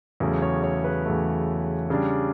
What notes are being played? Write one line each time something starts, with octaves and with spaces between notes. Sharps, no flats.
E2 C#3 F#3 A3
C#5
C#5
B4
E2 C#3 F#3 A3
C#3 G3 D4